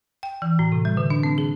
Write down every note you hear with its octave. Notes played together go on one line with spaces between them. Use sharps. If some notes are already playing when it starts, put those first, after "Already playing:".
G5
E3
A2
C3
G3
D3
D4
C4
G#4